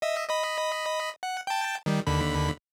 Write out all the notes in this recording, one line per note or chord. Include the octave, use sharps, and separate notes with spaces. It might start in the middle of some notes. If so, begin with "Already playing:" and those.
D#5 E5
D#5 B5
F#5
G5 A5
D#3 G3
D#2 D3 B5